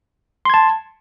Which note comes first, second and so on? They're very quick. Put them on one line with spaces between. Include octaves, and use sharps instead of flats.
C6 G#6 A5